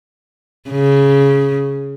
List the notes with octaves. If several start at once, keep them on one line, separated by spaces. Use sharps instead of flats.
C#3